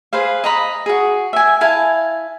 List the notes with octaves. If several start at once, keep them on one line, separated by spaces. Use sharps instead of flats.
G#4 B4 C5 F5
D#5 A#5 B5
F#4 G#4
E5 G#5
E4 F5 G#5 A5